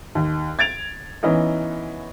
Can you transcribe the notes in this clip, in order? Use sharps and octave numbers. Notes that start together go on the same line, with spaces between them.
D#2
G#6 A6 D7 F7
E3 B3 C#4 D#4